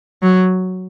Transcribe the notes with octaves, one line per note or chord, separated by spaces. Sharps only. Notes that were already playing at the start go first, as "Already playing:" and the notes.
F#3